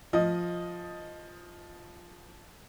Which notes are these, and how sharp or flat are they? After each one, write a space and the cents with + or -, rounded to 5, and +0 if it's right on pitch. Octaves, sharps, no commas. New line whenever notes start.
F3 +0 D#5 +0